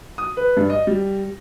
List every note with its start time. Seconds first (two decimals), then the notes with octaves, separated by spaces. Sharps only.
0.18 D#6
0.37 B4
0.57 G2
0.70 D#5
0.87 G3